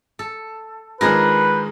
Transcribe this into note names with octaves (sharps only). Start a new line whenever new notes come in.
A4
D#3 F3 G#3 D4 G#4 A#4 B4